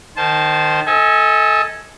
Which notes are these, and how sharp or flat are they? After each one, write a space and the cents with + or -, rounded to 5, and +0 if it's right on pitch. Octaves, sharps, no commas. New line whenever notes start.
D#3 -20 C5 +0 A5 -25
A4 +0 D#5 +35 G#5 +0